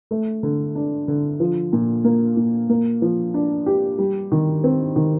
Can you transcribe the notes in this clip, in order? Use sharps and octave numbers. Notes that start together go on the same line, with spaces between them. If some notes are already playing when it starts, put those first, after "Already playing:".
A3
D3
D4
D3
F3
A#2
A#3
A#2
A#3
F3
D4
G4
G3
D#3
C4
D#3